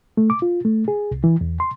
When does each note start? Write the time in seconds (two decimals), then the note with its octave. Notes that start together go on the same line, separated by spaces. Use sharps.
0.17 A3
0.30 D6
0.42 F4
0.65 A3
0.88 G#4
1.11 C2
1.24 E3
1.41 E2
1.60 C6